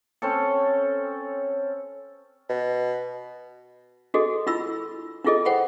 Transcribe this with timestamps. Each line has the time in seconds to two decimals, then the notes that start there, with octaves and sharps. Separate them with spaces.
0.22 C4 C#4 A4
2.49 B2
4.14 D4 F#4 G#4 A4 D#5
4.47 D4 E4 F4 B5 E6
5.24 D4 E4 F4 G#4 A4 D#5
5.45 C5 F#5 G5 B5